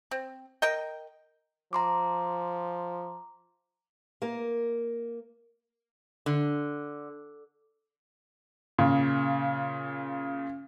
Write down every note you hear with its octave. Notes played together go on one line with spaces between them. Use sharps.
C4
A#4 D#5 G5
F3 A#5 C6 D6
A#3 A#4
D3
A#2 C#3